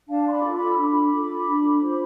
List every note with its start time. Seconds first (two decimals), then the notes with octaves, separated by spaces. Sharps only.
0.09 D4 F5 A5
0.27 C6
0.32 B5 D6
0.43 F4 A4
0.54 B5 D6
0.71 E6
0.77 D4 B5 D6
1.11 F4 A4
1.46 D4
1.81 F4 C5